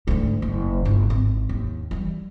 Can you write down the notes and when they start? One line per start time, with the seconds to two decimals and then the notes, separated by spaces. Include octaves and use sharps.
0.07 D2 G#2
0.42 F#1
0.85 G1
1.10 G#1
1.49 D#2
1.91 E3 G3